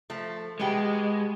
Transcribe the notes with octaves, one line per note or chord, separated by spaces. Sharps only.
F3 A3
B2 G#3 B3 G4